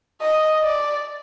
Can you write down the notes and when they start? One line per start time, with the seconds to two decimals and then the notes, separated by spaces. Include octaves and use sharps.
0.21 D#5
0.63 D5